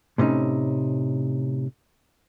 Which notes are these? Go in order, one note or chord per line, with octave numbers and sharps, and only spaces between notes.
A2 C3 C#4 D#4